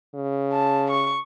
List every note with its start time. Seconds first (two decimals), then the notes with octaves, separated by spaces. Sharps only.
0.15 C#3
0.53 A5
0.91 C#6